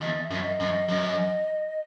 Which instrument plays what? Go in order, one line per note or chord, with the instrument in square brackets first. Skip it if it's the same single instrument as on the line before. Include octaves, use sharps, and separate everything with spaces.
[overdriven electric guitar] E2 [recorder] D#5
[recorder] E5
[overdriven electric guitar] F#2
[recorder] E5
D#5
[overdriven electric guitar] F#2
F#2